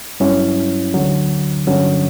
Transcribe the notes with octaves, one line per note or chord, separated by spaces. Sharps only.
G2 F#3 C#4 E4
D2 D3 F#3
G2 D3 F#3 C#4